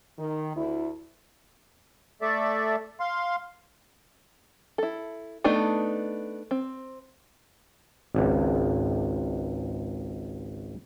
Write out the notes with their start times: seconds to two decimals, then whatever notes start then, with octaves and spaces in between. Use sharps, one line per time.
0.19 D#3
0.55 D2 E4
2.22 A3 A4 D5 E5
3.00 F5 C6
4.78 E4 A4
5.44 A3 B3 D4 D#4
6.51 C4
8.15 G#1 C#2